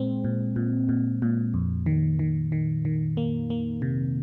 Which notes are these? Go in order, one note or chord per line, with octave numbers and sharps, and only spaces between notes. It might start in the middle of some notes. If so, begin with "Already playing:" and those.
Already playing: A#2 G#3 C4
A#2
A#2
A#2
A#2
F2
D#3
D#3
D#3
D#3
A#3
A#3
C3